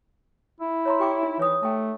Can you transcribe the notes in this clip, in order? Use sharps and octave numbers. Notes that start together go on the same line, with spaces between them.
E4
C#5 A#5 C6
G4 G5 D6
D#4
E3 C#5 D#6
A3 G5 A5